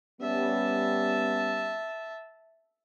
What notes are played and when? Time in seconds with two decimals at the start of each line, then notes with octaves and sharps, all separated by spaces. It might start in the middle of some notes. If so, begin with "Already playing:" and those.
0.21 G3 B3 C#4 E5 A5